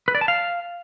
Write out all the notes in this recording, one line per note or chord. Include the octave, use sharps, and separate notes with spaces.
B4
D5
A5
F5